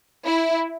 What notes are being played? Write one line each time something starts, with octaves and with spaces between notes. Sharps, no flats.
E4